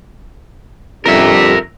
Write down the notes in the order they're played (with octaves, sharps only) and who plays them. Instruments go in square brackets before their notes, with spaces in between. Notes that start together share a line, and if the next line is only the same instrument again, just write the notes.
[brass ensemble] F2 D3 G3 [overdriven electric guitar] A#4 E5